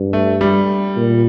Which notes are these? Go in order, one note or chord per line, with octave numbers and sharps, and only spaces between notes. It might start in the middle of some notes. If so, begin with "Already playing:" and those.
Already playing: G2
A3
G3
A#2